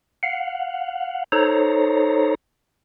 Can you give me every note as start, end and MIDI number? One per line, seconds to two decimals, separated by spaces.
0.23 1.24 77
0.23 1.24 78
1.32 2.35 63
1.32 2.35 69
1.32 2.35 72
1.32 2.35 73
1.32 2.35 82